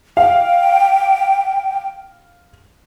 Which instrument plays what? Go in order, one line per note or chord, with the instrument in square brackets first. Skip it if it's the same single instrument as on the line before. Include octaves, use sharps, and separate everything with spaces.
[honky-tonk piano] F5 [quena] G5